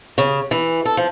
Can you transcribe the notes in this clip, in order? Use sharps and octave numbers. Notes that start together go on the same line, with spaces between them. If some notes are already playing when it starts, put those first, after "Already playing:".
C#3
E3
A4
F3